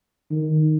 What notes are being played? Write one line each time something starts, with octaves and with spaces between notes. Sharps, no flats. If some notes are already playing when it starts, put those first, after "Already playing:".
D#3